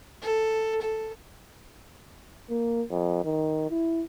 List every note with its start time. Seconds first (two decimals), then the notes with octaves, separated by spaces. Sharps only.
0.22 A4
0.81 A4
2.50 A#3
2.90 F2
3.25 D#3
3.71 E4